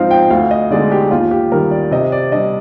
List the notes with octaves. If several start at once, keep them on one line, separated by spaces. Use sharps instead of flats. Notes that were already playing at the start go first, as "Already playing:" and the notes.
Already playing: G#2 F3 C4 D#4 F5
G5
D2 F5
D#5
D3 G#3 D#4 D5
G4
D#2 F4
G4
D#3 G3 A#4
D5
C3 D#5
D5
G3 D4 D#5